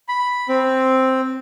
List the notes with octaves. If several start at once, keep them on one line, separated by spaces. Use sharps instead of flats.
B5
C4